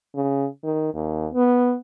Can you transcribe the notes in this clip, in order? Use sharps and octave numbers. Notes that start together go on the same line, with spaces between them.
C#3
D#3
D#2
B3